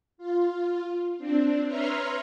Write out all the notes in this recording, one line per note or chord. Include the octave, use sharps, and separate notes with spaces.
F4
C4 D4
B4 C#5 E5 A#5 C6 F6